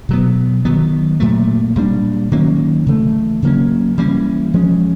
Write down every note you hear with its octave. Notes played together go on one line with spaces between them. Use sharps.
B2 F#3 B3
D#3 F#3 B3
A#2 F#3 A3
A#2 G3 A#3 D4
D#3 F#3 A#3 C#4
C#3 E3 A3
C#3 F#3 A#3 C#4
E3 G3 A#3 C#4
F3 G#3 C#4